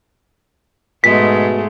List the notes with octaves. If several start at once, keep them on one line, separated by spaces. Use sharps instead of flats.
G#2 B2 G#3 A3 B6